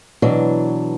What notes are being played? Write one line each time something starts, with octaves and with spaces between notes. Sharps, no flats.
B2 E3 F#3 D4